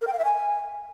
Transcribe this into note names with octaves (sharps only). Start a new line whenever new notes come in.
A#4
G5
F5
E5
G#5